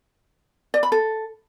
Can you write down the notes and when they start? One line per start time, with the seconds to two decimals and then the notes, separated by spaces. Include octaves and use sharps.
0.74 D5
0.83 B5
0.92 A4